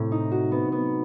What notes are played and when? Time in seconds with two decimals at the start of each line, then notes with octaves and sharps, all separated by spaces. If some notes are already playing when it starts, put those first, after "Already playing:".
Already playing: A2 C3
0.12 D#4
0.32 F#4
0.52 B3
0.72 B3